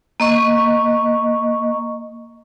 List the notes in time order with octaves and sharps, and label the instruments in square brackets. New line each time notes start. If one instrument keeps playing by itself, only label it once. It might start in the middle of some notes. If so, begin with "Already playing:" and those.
[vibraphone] A#3 D#5 C#6